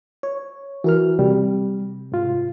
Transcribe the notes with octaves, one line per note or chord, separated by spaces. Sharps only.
C#5
E3 F#4 A#4 F6
C3 G3
G#2 F4